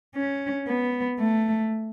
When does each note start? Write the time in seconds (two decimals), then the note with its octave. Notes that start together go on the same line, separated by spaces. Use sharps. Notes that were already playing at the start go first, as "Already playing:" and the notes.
0.16 C#4
0.68 B3
1.20 A3